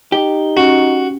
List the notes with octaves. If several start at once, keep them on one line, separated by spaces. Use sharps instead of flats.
D#4 G4
C#4 F#4